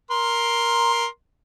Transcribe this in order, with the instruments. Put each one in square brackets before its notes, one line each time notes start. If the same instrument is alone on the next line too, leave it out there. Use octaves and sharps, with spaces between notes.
[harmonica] A#4 C6